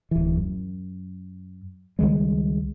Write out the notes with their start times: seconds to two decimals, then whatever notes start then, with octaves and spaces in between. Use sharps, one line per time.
0.11 D1 E3
0.36 F#2
1.99 C#2 D#3 G3 G#3